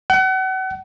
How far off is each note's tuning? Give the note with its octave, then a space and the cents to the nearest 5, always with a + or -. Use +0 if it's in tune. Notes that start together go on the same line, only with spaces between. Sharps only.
F#5 +35